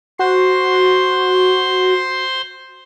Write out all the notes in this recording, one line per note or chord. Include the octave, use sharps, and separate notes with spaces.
F#4 C5 C6